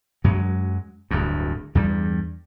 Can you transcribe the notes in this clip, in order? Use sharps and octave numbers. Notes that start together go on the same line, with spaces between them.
F#2 F#3 G#3
D1 D2 G2
E2 G2 G3